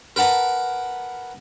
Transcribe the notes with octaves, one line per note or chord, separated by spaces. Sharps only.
A#4 B4 F#5 A5 A#5